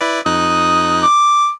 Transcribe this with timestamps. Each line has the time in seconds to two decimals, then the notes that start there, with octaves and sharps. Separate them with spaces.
0.01 E4 B4 D5
0.26 F2 D#4 D#6 F#6
1.03 D6